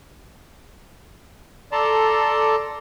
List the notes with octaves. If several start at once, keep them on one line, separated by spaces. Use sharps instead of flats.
A4 D5 A5 A#5 C6